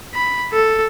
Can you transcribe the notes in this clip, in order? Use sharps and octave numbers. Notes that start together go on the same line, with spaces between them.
B5
A4